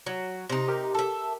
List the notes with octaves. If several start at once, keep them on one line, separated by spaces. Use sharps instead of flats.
F#3
C3 D#4 A#6
G4 A#4
A4 E5